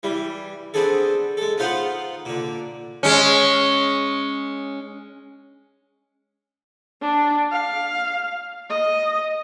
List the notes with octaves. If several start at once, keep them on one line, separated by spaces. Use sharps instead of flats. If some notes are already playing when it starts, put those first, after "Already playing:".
E3 G3
B3 C4 D4 G#4 A4
G#3 A4
B3 D#4 F4 C5 F5 F#5
A#2 D3
G#3 C#4
D4
F5
D#5